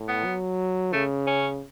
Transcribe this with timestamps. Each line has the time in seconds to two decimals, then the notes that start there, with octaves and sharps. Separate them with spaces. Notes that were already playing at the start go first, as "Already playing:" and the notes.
Already playing: A2
0.08 B3
0.25 F#3
0.93 C#3 A3
1.27 C#4